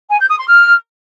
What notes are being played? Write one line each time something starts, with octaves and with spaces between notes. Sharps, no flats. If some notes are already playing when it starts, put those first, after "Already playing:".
G#5
G6
D#6
C6
F6